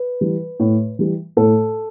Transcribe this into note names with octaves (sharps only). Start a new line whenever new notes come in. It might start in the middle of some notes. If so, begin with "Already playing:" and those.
Already playing: B4
E3 G3
A2
E3 G3
A2 A4